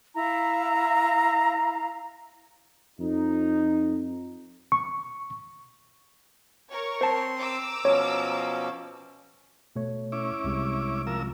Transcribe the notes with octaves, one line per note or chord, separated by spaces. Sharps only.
E4 F5 A#5
F2 D#4
C#6
A#4 C#5 C#6
C4 C5 A5 C6 C#7
A#5 D6 E6
B2 F3 C#4 C#5
B2 A3 C#5
C#4 E4 D6
C2 C3 G#3
F3 A#4 E6